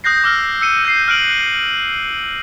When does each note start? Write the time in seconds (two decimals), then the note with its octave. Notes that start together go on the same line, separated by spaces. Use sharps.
0.04 D#6 F#6 G6 A#6 C7
0.24 D6 E6 F6
0.61 E6 C#7 D#7 G7
0.85 G6 C7
1.08 F6 F#6 D7 F#7